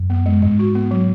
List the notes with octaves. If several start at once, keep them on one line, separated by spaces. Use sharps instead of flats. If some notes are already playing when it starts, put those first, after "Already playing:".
Already playing: F#2
B3
G#3
G#2 G#3
F#4
B3
F#3